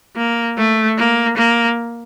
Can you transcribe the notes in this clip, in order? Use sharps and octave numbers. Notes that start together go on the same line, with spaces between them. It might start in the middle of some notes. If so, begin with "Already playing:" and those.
A#3
A3
A#3
A#3